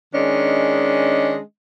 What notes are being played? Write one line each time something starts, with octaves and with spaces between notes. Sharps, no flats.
D#3 G#3 C#4 D4 D#5